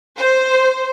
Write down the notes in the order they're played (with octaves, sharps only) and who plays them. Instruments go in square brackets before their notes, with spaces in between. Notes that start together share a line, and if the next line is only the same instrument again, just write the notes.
[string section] C5